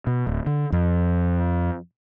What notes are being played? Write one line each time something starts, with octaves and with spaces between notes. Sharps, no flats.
B2
D1
D3
F2